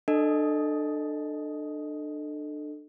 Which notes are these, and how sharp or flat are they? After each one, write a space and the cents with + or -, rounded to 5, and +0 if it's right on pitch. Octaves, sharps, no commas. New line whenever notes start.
D4 +30 A4 +5 D#5 +0